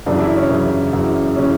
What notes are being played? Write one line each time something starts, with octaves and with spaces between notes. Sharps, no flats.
F#2 C#3 E3 D4
E4
C#4
F#2 C#3 E3
F#2 C#3 E3
C#3 E3 C#4